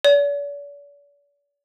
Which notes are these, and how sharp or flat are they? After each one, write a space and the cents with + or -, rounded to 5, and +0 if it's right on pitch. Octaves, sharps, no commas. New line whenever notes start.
D5 -45